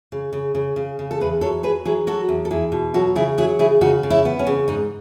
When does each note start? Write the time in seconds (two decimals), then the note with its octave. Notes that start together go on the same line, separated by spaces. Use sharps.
0.12 C#3
0.33 C#3
0.55 C#3
0.76 C#3
0.99 C#3
1.11 A4
1.20 E2 G#4 B4
1.41 F#3 A4 C#5
1.63 F#3 G#4 B4
1.85 F#3 E4 G#4
2.07 F#3 F#4 A4
2.29 E2
2.45 A4
2.51 E2 E4 G#4
2.72 B2
2.94 F#3 F#4 A4
3.15 C#3 E4 G#4
3.38 F#3 E4 G#4
3.59 C#3 E4 G#4
3.81 C#3 D#4 F#4
4.03 C#3
4.10 C#4 E4
4.25 B3
4.39 C#4
4.47 C#3
4.68 G#2 D#4